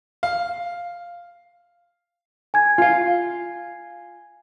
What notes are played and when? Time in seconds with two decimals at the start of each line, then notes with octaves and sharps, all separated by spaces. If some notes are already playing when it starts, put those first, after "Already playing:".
0.23 F5
2.54 G#5 G#6
2.78 F4 F5